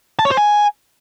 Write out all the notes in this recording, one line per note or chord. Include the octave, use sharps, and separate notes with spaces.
A5
C#5
C5
G#5